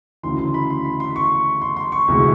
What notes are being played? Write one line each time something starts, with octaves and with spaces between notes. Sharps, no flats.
D2 C#3 E3 C6
C6
B5
C6
B5
C6
C#6
C6
C6
C#6
D2 C3 E3 G#3